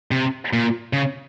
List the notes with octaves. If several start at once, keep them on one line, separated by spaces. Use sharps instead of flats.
C3
A#2
C#3